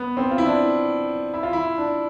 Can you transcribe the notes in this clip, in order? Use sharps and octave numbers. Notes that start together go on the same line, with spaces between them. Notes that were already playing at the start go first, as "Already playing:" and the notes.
Already playing: B3
C4
F4
E4
D4
E4
F4
E4
D4